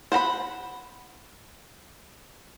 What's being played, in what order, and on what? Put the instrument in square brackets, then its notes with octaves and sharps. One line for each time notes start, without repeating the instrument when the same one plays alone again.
[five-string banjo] C5 F#5 A#5 B5